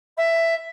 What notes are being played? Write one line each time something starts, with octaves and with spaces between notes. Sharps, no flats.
E5